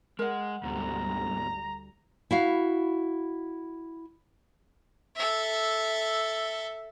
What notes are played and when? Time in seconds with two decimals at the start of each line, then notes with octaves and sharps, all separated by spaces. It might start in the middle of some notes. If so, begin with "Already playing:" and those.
0.19 G#3 A#4 F#5
0.64 D2 G#2 B2 G3 A#5
2.31 E4 F#4 F5
5.16 A4 E5